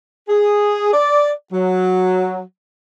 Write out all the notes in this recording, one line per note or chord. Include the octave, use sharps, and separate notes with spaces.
G#4
D5
F#3